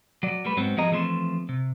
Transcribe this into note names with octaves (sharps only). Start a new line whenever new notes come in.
F#3 D5
G3 A3 B4
G#2 F#3 G#3 B3 C4
E2 F3 G3 G#4 D#5 A#5
E3 F3 A3 C4 C6
C3